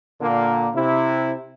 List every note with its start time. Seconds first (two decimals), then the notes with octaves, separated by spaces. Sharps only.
0.21 A#2 D3 A#3
0.74 C3 E4